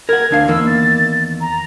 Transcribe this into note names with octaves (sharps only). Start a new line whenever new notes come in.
A#4 F#5 G#6
D2 D4 F5 G#6
E2 D#3 A#3 E6
A6
A#5